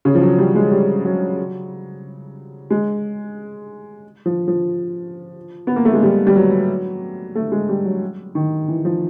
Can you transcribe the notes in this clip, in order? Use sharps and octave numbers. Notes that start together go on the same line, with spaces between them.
C#3
F3
F#3
G3
G#3
G3
F#3
G#3
F3
F3
B3
A#3
A3
G#3
G3
G3
F#3
A3
G#3
G3
F#3
D#3
E3
F3